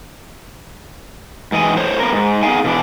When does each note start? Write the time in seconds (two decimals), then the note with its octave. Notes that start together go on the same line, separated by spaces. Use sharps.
1.52 G#2 E3 D#5 G#5
1.77 A2 C5 C#5
2.00 B3 A#4
2.13 G#2
2.43 B3 D#4 G#4 F5 G#5
2.64 B2 E3 D4